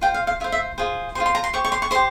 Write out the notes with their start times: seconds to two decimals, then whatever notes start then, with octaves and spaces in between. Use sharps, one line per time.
0.01 F4 C5 G5
0.14 F5
0.27 F5
0.40 F4 E5
0.44 C5
0.52 E5
0.78 F4 G#4 C5
1.15 F4 G#4 C5 C6
1.26 C6
1.35 A#5
1.44 C6
1.53 G4 C5 C#6
1.65 C#6
1.72 C6
1.82 C#6
1.91 G4 C5 C6